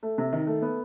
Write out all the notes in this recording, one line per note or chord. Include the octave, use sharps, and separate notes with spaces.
A3
C3
D#3
A3
B3